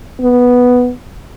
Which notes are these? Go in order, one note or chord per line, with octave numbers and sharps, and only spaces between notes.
B3